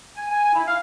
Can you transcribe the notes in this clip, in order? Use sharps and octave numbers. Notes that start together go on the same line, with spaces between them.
G#5
G#5
E4
F5